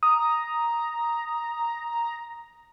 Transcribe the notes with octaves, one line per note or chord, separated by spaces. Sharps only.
A#5 D#6